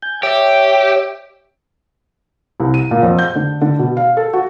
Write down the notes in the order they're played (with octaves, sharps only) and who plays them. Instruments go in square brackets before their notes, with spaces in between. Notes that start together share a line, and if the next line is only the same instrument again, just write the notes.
[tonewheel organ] G#5 G6
[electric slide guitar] G4 [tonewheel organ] C#5 E5
[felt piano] C2
D#7
A#2
F2
G6
D3
D3
B2
F5
A4
F#4